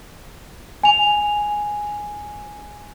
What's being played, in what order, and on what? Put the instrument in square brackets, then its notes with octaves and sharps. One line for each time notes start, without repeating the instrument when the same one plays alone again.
[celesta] G#5 F7